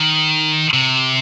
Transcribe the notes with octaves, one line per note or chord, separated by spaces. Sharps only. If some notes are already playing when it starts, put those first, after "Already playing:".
Already playing: D#3
C3